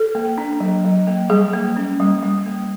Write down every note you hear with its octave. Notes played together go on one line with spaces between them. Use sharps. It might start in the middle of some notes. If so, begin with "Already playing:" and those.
Already playing: A4
A#3
D4
F#3
F#3
A#3
G3 G#4
A#3
C#4
G3
G3
A#3